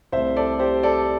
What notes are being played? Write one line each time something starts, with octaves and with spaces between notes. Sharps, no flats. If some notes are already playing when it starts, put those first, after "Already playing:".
C2 C3 A3 C5 E5
A4 D5
G4 C5
A4 D5